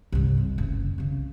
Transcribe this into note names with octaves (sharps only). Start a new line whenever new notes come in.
C2 G2
C3
F#1 D2
C2 C#3